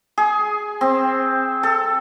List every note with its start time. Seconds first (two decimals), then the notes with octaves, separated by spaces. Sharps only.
0.18 G#4
0.81 C4
1.63 A4